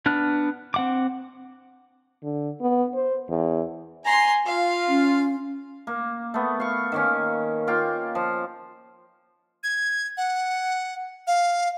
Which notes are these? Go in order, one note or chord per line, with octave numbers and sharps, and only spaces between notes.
B3 D4 F6 F#6
C4 F#5 D6
D3
B3
C5
E2
G#5 A#5 C6
F4 F5
C#4
A#3
A3 B3
F5 C#6
D#3 A#3 C#4
A#3 F4 F5 G5
F3
G#6
F#5
F5